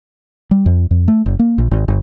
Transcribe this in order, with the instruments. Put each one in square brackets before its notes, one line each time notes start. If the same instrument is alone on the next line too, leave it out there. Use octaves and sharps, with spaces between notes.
[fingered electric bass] G3
F2
F2
A3
F#1
A#3
A#1
G#1
G1